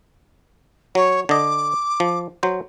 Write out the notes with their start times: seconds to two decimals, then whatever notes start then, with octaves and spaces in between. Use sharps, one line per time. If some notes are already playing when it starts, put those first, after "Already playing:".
0.95 F#3 C#5
1.29 D3 D#5 D6
2.00 F3
2.43 F#3 C5